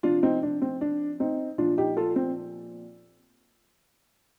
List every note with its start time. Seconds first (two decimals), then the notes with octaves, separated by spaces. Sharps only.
0.03 C3 F3 D4 F4
0.23 C4 D#4
0.43 D4
0.62 C4
0.81 D4
1.20 C4 D#4
1.58 A#2 F3 D4 F4
1.78 D#4 G4
1.97 F4 A4
2.16 C4